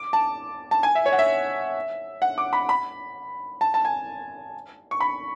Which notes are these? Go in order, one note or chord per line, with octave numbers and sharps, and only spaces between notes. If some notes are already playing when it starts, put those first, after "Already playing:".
Already playing: D6
A5
A5
G#5
E5
C#5
F#5
E5
F#5
D6
B5
B5
A5
A5
G#5
C#6
B5